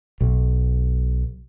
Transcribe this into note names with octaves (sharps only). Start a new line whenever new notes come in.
B1